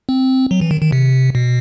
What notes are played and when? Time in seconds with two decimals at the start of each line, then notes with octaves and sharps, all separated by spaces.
0.09 C4
0.51 F#3
0.61 E3
0.71 D#3
0.82 D#3
0.92 C3
1.35 B2